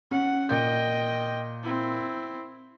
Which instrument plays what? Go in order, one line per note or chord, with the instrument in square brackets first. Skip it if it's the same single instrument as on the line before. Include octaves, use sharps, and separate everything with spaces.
[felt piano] C#4 [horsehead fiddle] F#5
[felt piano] A#2 G6 [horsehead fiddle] D#5 G5
[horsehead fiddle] C4 E4